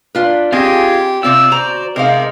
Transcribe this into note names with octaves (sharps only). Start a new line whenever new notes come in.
D4 F4 B4
C4 F4 G4 G#4 D#5
C3 C4 F4 D5 E6
F#4 C5 A#5
C3 G#3 D#4 A#4 C5 F5